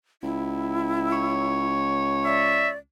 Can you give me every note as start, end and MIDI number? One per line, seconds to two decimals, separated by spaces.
0.23 2.82 37
0.23 1.72 64
1.12 2.72 73
2.25 2.77 74
2.25 2.70 76